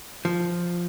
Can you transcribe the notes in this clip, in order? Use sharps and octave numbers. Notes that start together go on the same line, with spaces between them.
F3